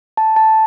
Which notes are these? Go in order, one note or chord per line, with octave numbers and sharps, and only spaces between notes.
A5
A5